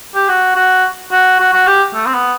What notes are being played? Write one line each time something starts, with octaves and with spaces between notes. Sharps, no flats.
G4
F#4
F#4
F#4
F#4
F#4
G4
A3
C4
B3